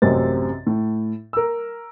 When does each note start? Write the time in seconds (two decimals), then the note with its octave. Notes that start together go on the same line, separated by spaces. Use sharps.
0.02 A1 F#2 C3 C4 A#4 A6
0.67 A2
1.33 A#4 E6